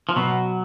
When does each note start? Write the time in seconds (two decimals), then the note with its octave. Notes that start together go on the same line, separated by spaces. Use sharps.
0.09 F3
0.16 B2 F#3